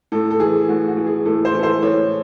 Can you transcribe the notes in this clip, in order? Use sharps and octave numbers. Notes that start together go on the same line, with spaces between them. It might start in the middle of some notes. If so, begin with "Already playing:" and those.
A2 A4
A4
E3 G#4
A2 F#4
F#4
E3
G#4
A2 A4
C5
E3 A4
C5
A2 C#5